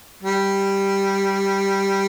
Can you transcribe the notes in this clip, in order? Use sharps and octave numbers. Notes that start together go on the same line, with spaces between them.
G3